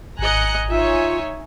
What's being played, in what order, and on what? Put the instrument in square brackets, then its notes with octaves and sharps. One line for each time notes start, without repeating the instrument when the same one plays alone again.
[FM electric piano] G#1 [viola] D#5 G#5 [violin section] A#5 F#6 C#7
[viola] D#4 E5 [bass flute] F4 [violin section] C#5 G#5